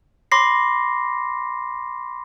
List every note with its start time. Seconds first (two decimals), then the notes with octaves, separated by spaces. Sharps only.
0.32 B5 C6 D6 A#6 C7